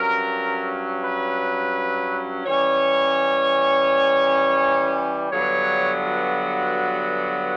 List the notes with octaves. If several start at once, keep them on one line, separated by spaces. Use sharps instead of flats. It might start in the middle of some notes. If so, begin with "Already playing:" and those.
Already playing: G2 F#3 C#4 A#4
B4
E3 G3 C#4 C#5
G2 D3 F#3 B3 C#5
F#4